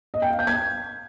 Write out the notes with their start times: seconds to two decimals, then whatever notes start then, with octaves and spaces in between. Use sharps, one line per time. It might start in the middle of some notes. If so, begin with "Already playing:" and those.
0.14 D#5
0.22 G5
0.30 F5
0.39 G6
0.47 G#6